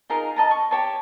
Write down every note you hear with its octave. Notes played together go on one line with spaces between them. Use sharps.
D#4 F4 G#4 A#4
D#5 A5 A#5
C#6
G4 C#5 A5